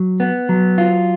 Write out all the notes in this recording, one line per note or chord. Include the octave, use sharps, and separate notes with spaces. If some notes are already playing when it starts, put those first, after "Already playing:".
Already playing: F#3
B3
F#3
F4